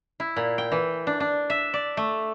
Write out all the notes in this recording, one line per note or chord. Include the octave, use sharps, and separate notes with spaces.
E4
A#2
G5
E3
D4
D4
E5
D5
A3